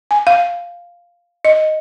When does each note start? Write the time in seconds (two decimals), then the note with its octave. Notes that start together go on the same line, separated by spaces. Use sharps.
0.11 G#5
0.27 F5
1.45 D#5